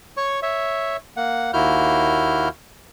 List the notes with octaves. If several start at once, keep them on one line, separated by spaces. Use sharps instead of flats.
C#5 C#6
C#5 E5
A#3 F#5
D#2 A#3 E4 F#4 F6 G6